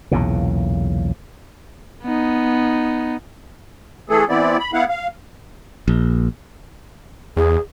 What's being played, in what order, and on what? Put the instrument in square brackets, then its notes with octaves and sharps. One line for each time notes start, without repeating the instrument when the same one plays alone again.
[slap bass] B1 E2 A#2 C#3
[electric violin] B3 D#4
[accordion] E3 A3 G#4 A4
E3 B3 C4 E4 D5
B5
B3 E4 F5 F#5
F5
[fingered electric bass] A#1
[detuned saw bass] E2 [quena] G#4